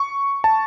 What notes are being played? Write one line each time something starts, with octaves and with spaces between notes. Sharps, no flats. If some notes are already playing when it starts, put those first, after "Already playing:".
Already playing: C#6
A5